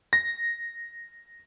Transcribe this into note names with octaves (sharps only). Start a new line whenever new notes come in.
A#6